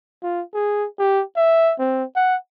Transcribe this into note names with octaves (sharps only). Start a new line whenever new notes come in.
F4
G#4
G4
E5
C4
F#5